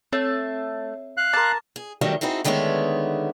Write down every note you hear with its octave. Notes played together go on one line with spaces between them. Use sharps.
A3 C4 A4 C#5
F5 F#6
A#4 A5 C6 D6
G#4
D#3 F#3 G3 A3 D4 D#4
C4 D#4 E4 F#4 G#4
D3 D#3 G#3 A3 B3 C#5